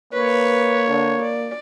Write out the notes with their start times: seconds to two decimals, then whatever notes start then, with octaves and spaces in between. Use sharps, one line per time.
0.13 A#3 B4 C#5
0.91 D3
1.22 D5